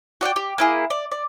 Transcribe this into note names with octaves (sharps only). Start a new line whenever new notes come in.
F#4 D5 F5 G5
G4
A#3 E4 G#4
D5
D5